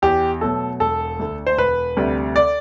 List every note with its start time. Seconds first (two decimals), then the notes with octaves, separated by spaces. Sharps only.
0.02 E2 G4
0.41 B2 F#3 A3 A4
0.80 E1 A4
1.19 D2 D3
1.47 C5
1.58 E1 B4
1.97 D2 C3 G3
2.36 D5